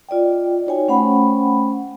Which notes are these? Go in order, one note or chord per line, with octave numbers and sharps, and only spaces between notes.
F4 D5 D#5 G5
D#4 F#4 C#5 G5 G#5
A3 C#4 C5 F#5 G5 B5